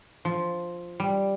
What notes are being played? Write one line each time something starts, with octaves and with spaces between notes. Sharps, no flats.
F3
G3